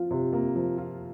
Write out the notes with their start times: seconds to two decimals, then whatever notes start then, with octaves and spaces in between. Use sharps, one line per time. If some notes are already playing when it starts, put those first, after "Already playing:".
Already playing: F3 F4
0.11 C3
0.33 A#3
0.55 F3
0.78 F4